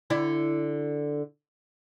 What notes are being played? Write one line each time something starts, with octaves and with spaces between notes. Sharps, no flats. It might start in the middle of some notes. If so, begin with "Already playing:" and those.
D3 E4 D5